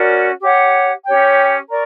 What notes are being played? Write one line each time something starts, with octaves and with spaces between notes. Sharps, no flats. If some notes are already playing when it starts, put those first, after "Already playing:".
Already playing: C#4 F#4 A#4 D5
G4 C#5 F#5
C#4 G4 C#5 G5
A#4 D5 A#5 C#6